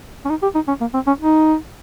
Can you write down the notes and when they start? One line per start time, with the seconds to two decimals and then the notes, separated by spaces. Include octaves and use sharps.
0.25 C#4
0.30 D#4
0.42 G4
0.55 D#4
0.68 C#4
0.81 A#3
0.94 C4
1.07 C#4
1.20 D#4